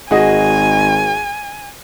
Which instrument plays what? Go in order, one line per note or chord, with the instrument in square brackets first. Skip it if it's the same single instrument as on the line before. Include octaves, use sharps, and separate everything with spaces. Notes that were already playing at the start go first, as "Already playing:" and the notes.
[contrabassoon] G#1 [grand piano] F#4 G#4 D#5 [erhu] G#5